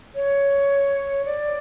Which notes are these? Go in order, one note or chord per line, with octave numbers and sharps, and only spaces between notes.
C#5
D5